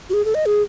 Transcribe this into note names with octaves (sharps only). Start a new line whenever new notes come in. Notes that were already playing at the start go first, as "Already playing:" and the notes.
F#4
G#4
A4
D#5
G#4